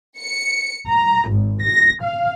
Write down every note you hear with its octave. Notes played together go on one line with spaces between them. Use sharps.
C#7
A#5
G#1
A#6
F5